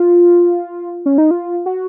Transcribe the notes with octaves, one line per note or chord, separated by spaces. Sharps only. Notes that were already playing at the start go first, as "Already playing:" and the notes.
Already playing: F4
C#4
D#4
F4
F#4